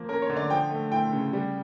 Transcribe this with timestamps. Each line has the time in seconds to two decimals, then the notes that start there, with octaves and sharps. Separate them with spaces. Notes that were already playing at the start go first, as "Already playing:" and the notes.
Already playing: F3 A#3
0.09 C#4 A#4
0.22 C#5
0.30 D3
0.37 D5
0.50 F3 G5
0.71 A3
0.92 E4 G5
1.13 C#3
1.33 G3